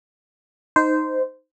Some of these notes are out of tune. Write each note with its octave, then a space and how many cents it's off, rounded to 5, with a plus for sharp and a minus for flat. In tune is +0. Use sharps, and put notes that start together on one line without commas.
D#4 +0 C5 -15